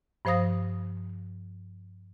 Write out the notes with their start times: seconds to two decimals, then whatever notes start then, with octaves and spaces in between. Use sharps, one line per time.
0.25 G2 F3 C5 F5 D#6 A#6